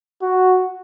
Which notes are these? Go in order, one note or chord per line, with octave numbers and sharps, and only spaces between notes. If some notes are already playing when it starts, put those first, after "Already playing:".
F#4